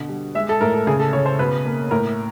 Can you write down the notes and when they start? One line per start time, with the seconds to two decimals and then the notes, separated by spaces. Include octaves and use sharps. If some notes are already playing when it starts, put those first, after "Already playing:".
Already playing: B2 D3
0.09 G3
0.35 G#3 E5
0.49 A4
0.61 A2 A#4
0.74 A4
0.87 C#3 G#4
1.00 A4
1.13 C#3 C#5
1.26 C5
1.39 B2 B4
1.66 A#3
1.91 A2 A#4